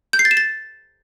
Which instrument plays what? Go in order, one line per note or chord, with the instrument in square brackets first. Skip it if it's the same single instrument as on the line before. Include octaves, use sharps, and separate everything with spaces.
[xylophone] G6
C7
A6
E7
A6